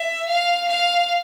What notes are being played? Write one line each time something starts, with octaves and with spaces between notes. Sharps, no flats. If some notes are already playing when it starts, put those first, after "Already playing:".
Already playing: E5
F5
F5